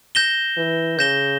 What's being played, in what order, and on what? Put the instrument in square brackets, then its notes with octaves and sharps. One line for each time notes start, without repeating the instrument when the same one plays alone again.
[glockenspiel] G6 A#6 E7 G7
[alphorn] E3
[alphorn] C#3 [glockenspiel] G6 A#6 E7 G7